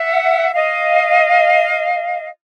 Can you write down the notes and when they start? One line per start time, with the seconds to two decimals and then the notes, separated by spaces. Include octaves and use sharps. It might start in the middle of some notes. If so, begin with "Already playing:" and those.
Already playing: E5 F#5
0.53 D#5 F5